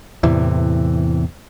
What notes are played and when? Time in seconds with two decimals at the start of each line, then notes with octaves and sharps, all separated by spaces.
0.23 E2 A2 C3 E3